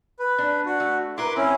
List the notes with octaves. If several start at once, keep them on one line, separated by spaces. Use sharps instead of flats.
B4
D4
F#4
A3
E4 A#4 B4 C6 D6
C4 C#4 E4